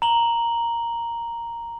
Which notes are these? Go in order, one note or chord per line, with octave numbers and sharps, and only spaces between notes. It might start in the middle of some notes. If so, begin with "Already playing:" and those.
A#5 F#7 G7